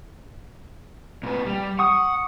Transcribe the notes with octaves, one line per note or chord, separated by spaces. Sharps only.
A#2 B4
G3
F#5 C#6 D#6